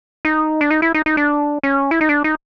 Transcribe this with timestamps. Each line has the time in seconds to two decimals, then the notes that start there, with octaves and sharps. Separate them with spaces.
0.25 D#4
0.61 D4
0.71 D#4
0.82 E4
0.94 D#4
1.06 D#4
1.17 D4
1.63 C#4
1.91 E4
2.01 D#4
2.09 D4
2.24 D#4